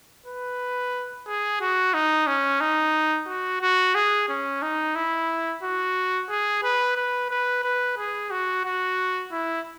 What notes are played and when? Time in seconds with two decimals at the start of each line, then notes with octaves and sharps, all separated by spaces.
0.26 B4
1.27 G#4
1.61 F#4
1.94 D#4
2.27 C#4
2.60 D#4
3.28 F#4
3.61 F#4
3.95 G#4
4.29 C#4
4.62 D#4
4.96 E4
5.63 F#4
6.29 G#4
6.64 B4
6.96 B4
7.30 B4
7.64 B4
7.98 G#4
8.31 F#4
8.64 F#4
9.32 E4